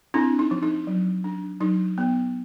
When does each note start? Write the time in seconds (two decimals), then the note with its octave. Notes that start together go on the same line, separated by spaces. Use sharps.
0.14 C4 D4 E4
0.39 D#4
0.51 F3
0.63 D#4
0.87 F#3
1.24 D4
1.61 F#3 D#4
1.98 B3